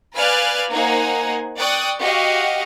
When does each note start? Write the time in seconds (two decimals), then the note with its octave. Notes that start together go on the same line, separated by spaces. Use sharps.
0.16 B4 D5 F5 G#5 F6 F#6
0.71 A#3 D#4 C5 F#5 G#5
1.57 D5 G5 C#6 D#6 F#6
2.01 F#4 G4 D#5 F5